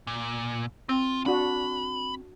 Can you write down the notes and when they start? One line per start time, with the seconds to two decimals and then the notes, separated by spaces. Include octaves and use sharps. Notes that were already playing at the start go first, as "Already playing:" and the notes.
0.07 A#2
0.89 C4 F4
1.26 D4 F#4 B5